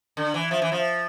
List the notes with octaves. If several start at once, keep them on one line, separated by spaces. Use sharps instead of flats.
D3
E3
F3
E3
F3